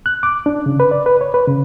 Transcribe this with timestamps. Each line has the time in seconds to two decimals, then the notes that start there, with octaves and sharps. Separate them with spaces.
0.06 F#6
0.23 D6
0.46 D4
0.66 C#3
0.80 B4
0.91 D5
1.06 B4
1.21 C#5
1.34 B4
1.47 C#3